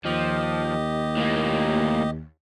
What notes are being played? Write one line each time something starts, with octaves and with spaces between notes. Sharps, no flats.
D#2 F3 G4 D#5
A2 A#3